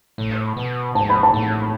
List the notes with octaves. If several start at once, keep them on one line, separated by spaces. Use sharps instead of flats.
A2
B2
G#2 A5
B5
A5
A2